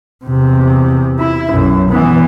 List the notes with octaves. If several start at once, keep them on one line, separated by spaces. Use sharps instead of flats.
E2 C3
E4
B1 F#2
E3 B3